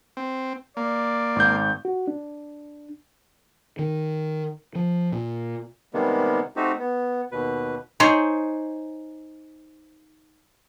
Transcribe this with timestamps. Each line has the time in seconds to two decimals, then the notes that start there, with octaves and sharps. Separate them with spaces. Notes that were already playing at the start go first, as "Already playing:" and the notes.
0.17 C4
0.77 A#3 D5
1.36 G#1 G6
1.85 F#4
2.08 D4
3.79 D#3
4.75 F3
5.12 A#2
5.94 C3 D#3 G3 G#3 A#3 B3
6.56 A3 C4 D#4 F#4 G4
6.79 B3
7.32 D#2 B2 B4
8.00 D#4 G#4 C5 C#5